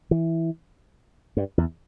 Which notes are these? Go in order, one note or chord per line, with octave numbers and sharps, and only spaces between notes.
E3
G2
E2